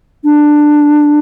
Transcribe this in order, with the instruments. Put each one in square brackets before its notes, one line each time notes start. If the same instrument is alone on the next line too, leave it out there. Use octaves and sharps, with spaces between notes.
[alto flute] D4